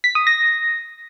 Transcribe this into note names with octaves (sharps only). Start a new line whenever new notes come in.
B6
D#6
A#6